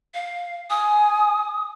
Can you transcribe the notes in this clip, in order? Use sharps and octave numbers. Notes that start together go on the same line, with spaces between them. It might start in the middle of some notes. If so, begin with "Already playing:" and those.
F5
G#5 D#6